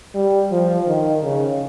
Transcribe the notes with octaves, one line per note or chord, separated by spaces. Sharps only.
G3
F3
D#3
C#3